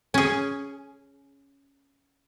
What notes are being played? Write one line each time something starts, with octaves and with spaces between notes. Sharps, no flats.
C#4 G#4